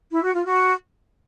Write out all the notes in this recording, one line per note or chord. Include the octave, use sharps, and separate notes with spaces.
E4
F#4
F4
F#4